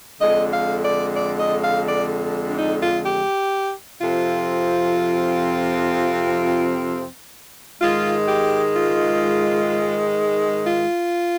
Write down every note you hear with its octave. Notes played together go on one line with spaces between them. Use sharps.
F2 D3 G#3 D#5
F5
D5
D5
D#5
F5
D5
D4
D#4
F4
G4
F2 C3 F3 C4 F4
G#2 D#3 G#3 F4
G4
F4
F4